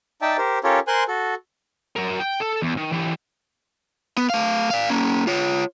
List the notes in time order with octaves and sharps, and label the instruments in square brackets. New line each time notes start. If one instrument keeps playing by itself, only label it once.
[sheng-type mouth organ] D#4 D5 E5 G5 A5
G4 A#4 C5
C#4 F4 G4 A4 A#4 C#5
A#4 C5 G#5 C6 F#6
F#4 A4
[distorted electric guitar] F#3 A#4
G5
A4
E2
D#3
E3 G4
[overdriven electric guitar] B3
A3 F5
D5 F5
A#3 C#4
F4 C#5